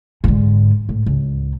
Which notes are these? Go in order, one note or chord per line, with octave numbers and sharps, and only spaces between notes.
G#2 D3
A2
C#2